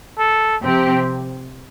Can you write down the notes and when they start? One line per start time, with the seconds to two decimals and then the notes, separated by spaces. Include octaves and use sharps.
0.18 A4
0.61 C3 F3 C4 G4